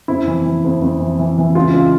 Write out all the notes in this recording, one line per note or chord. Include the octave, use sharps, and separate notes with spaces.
F2 E4
E3
E3
F2
F2
E3
E3
E3
C#2 F4
C#2